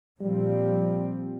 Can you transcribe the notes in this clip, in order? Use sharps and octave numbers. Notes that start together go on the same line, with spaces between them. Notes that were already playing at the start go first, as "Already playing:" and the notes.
A#2 F3 G3 C4